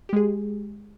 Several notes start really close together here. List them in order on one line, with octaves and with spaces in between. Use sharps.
G4 G#3 G#4